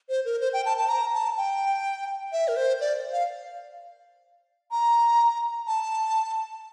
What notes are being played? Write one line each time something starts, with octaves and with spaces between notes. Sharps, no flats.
C5
A#4
C5
G5
A5
A5
A#5
A5
G5
E5
A#4
C5
D5
F5
A#5
A5